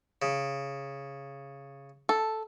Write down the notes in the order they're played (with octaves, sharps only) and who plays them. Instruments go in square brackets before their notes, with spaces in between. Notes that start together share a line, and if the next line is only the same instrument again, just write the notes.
[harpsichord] C#3
[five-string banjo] A4